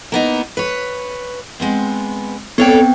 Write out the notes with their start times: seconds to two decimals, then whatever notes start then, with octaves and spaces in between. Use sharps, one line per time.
0.12 A#3 B3 D#4
0.57 B4 C#5
1.60 G#3 B3 C4
2.58 B3 C4 A4 C#5 D5 G5